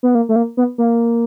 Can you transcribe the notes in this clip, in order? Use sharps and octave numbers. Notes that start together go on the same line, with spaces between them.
B3
A#3
A3
A#3
B3
A#3